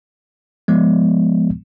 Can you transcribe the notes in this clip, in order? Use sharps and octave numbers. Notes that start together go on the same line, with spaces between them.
F3 G#3 B3